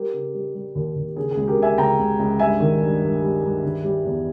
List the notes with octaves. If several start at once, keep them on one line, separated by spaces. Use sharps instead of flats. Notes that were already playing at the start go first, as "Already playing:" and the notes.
Already playing: G3 G4 A#4
C#3
G3
G3
D#2
D#2
C#3 G#4
G#4
C#2
G4 A#4
C#3
E5 G#5
C#2 G5 A#5
C#2
C#2
G2 E5 G#5
D#3
G2
G2
G3
G2
D#3
G3
E2